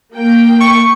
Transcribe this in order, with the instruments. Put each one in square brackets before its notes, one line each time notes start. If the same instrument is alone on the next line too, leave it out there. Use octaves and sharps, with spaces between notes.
[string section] A#3 G5
[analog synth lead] C#6